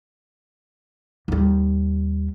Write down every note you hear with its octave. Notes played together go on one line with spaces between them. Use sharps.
D#2 G3